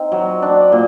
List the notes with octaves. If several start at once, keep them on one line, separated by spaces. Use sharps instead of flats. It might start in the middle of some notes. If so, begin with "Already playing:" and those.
Already playing: C4 D#4
F#3
D4
A#2